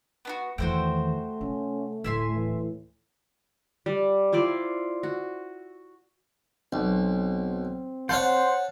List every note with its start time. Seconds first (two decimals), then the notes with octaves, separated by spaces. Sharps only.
0.25 B3 D4 F#4
0.58 E2 D#3 A3 F#4 C5 G5
1.41 C3 C#4
2.04 D1 A2 E5 G#5 C6
2.35 E3
3.86 G3
4.32 E4 F4 C5 D5
5.03 F#4
6.73 B1 C4
8.09 C5 C#5 F5 F#5 A5